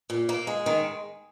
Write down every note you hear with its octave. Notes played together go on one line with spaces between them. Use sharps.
A#2
A#3
G#3
D#3